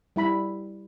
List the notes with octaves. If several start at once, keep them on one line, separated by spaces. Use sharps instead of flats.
G3 E4 B5